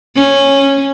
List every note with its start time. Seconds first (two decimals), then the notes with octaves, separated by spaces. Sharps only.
0.16 C#4